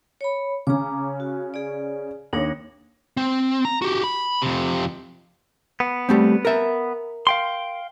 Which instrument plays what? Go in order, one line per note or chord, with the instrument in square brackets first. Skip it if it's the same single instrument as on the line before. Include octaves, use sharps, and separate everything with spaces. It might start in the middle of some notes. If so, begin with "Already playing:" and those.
[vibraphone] C#5 B5
[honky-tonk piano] C#3 C#4 [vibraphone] A#5 D6
[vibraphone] F#4
G#4 D5
[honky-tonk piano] D#2 A#6 [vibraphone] D4 D#4 C#5
[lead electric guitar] C4
A#5
F#4 G4
B5
F2 C3
[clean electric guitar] B3
[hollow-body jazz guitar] G3 A3 C4
A#4 E5
[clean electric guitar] F5 G5 C6